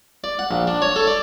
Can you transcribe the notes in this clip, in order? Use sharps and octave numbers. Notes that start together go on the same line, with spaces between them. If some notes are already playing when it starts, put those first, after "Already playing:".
D5
F#5
A#1
D4
C#5
A4
D5